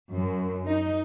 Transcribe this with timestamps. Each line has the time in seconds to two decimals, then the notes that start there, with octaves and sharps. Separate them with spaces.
0.13 F#2
0.66 D#4